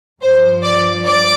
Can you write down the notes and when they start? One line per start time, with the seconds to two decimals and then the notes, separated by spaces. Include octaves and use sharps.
0.21 G2 F3 C5
0.63 D5
1.06 D5